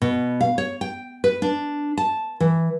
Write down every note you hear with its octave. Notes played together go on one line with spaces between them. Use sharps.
B2
F5
C#5
G5
B4
D4
A5
E3